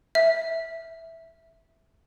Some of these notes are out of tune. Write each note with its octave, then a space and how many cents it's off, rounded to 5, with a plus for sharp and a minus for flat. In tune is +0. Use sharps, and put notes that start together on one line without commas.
E5 -5